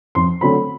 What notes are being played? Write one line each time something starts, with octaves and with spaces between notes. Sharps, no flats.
F2 C6
D3 F#3 A3 C4 B5